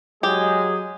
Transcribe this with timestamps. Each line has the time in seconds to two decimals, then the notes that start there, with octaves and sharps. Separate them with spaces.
0.23 F#3 G#3 G4 G#4